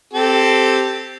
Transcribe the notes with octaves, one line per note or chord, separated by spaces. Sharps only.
C4 G4 A4